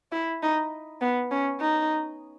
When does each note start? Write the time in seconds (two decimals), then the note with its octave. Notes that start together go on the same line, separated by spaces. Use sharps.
0.12 E4
0.43 D#4
1.01 B3
1.31 C#4
1.60 D#4